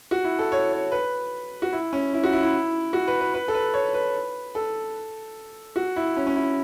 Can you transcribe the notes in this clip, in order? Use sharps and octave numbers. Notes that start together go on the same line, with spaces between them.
F#4
E4
A4
C#5
C#5
B4
F#4
E4
C#4
E4
F#4
E4
E4
F#4
B4
B4
B4
A4
B4
C#5
B4
A4
F#4
E4
C#4
C#4
E4